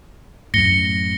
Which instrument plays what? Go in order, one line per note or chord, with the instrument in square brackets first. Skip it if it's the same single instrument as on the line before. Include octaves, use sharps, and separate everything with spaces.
[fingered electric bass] F#2 A2 [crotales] A#6 C#7 G7